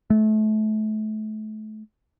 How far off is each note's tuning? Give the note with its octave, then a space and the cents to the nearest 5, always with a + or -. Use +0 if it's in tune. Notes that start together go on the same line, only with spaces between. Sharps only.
A3 -30